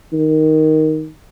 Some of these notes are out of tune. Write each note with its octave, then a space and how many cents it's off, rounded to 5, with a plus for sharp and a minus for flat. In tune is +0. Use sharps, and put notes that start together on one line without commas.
D#3 +5